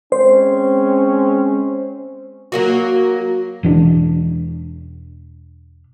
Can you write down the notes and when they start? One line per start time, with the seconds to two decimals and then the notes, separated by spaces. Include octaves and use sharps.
0.12 G#3 C4 C#4 C5
2.52 F#3 A#3 F#4
3.63 E1 E3 D4